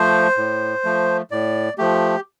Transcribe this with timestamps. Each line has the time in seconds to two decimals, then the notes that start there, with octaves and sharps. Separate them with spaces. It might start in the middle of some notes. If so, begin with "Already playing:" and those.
Already playing: F3 A3 C5
0.37 A2
0.84 F3 A3
1.31 A2 D5
1.78 F3 A3 G4